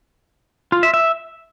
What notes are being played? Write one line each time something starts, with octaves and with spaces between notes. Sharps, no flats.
F4
E5
E5